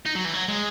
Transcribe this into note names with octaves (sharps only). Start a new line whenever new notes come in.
D#4
F#3
E3
F#3
G#3